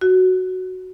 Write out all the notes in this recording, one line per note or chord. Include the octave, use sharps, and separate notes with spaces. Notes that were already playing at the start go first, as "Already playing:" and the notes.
F#4